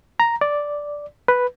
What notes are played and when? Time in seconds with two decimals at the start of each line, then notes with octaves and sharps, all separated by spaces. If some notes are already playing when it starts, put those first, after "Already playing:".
0.20 A#5
0.41 D5
1.28 B4